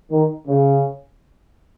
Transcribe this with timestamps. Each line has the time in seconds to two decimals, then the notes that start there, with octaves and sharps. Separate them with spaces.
0.10 D#3
0.47 C#3